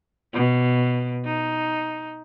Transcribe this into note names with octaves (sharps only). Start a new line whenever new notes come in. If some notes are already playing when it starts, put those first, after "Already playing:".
B2
D#4